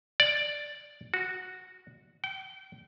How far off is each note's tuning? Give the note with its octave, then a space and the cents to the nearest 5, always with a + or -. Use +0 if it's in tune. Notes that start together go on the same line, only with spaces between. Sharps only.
D5 +0
F#4 -5
G5 -30